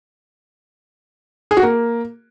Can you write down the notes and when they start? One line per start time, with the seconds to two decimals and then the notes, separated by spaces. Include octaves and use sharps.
1.51 G#4
1.57 F#4
1.63 A#3